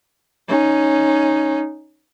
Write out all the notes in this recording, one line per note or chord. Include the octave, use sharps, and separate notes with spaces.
C#4 D#4